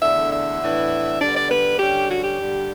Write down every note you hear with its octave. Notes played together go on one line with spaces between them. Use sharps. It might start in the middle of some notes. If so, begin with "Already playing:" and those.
E2 D3 A3 D4 E5
E5
A2 E3 B3 D4
D3 G3 B3 D5
D5
B4
D3 G3 C#4 G4
F#4
G4
G2 D3 G3 D4